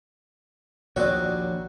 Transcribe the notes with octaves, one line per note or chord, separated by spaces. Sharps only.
A#1 D#2 C4 F#4 C#5 D5